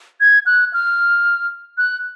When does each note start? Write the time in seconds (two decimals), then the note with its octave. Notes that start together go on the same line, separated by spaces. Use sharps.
0.21 G#6
0.46 F#6
0.73 F6
1.78 F#6